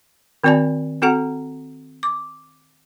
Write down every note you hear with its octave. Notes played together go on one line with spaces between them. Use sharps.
D#3 C4 F#4 D5 G#5 A5
C4 F#4 A4 F#5 A#5
D6